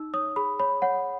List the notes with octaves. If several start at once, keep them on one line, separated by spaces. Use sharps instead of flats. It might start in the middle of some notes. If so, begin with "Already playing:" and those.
Already playing: D#4 E6
C#5 D#6
G#4 B5
C#5 B5
C#5 F#5